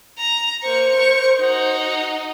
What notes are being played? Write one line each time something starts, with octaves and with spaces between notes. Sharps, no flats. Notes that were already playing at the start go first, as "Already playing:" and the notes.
A#5
A#3 C5 C#6
A#4 C#6
D#4 F#4